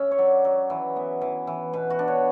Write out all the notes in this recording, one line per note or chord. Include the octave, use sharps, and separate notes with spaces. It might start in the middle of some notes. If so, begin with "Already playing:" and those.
Already playing: C#4 E5
C#5
F#3 D5
F#3
E3
B3
E3
E3
B2 B4
F#4
D4
C#5